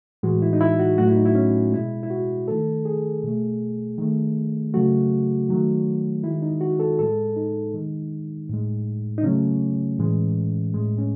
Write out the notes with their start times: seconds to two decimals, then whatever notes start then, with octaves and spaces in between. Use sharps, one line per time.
0.23 A2 E3 G#3 F#4
0.42 E4
0.53 D#4
0.61 E4
0.79 F#4
0.98 A2 F#3 A3 F#4
1.07 E4
1.16 D#4
1.26 E4
1.35 C#4
1.73 B2 G#3 E4
2.03 E4
2.10 F#4
2.48 D#3 A3 A4
2.85 G#4
3.24 B2 A3
3.98 D#3 A3
4.74 C#3 F#3 A3 F#4
5.49 D#3 F#3 A3
6.24 D#3 G#3 E4
6.42 D#4
6.61 F#4
6.80 A4
6.99 A2 G#3 A4
7.36 D#4
7.74 D#3 G#3
8.49 A2 G#3
9.18 D#4
9.23 C#3 F#3 A3 C#4
9.99 A2 E3 G#3
10.74 A2 G#3
10.98 C#4